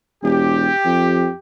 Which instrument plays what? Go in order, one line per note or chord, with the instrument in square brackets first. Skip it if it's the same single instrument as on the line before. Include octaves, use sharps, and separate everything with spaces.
[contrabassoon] E1 [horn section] G4
[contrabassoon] F2